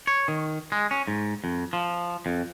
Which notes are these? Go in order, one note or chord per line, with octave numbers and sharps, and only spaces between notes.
C#5
D#3
G#3
C#4
G#2
F2
F3
F2